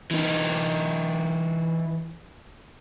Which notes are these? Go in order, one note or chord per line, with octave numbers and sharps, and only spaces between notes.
E3 D#4